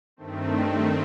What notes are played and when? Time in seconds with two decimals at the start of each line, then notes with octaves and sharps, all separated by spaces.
0.17 G2 D#3 A3 C4